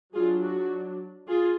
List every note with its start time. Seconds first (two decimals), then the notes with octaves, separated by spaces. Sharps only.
0.14 F#3 D4 F4 G#4
0.43 F#4
1.27 F4 G#4